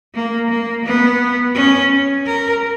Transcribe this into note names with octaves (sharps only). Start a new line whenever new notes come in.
A#3
A#3
B3
C#4
A#4